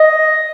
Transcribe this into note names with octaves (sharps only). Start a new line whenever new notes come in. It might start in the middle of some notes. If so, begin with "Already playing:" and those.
Already playing: D#5